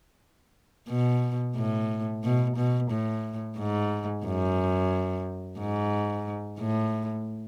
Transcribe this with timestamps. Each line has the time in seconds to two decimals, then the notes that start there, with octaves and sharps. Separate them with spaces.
0.88 B2
1.55 A2
2.23 B2
2.56 B2
2.90 A2
3.58 G#2
4.25 F#2
5.59 G#2
6.60 A2